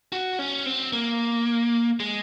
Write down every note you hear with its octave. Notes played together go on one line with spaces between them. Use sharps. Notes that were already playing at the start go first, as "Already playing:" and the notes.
F#4
C#4
C4
A#3
G#3